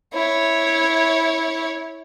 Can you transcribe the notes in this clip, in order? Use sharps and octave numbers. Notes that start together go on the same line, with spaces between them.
E4 C#5